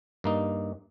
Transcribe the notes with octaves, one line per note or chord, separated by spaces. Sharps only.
G2 A#3 D#4